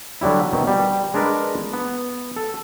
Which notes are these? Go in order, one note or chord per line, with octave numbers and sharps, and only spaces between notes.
D3 F#3 G3 E4
B2 D#3 C4
G3
G#3 D4 G#4 A#4 B4
B3
A4